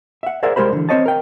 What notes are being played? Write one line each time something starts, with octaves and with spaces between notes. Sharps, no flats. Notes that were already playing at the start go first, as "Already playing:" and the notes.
E5 F#5
G#4 A#4 C5 D5 E5 F#5
C2 G#3 G4 A#4 C5 B5
D3 E3
C4 E4 C5 C#5 D#5 A5
A#4 G5